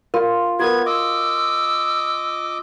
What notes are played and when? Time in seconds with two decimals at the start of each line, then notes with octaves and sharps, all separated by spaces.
0.14 F4 A#4
0.60 B3 F#4 A#4 G#6
0.86 D#5 D6 E6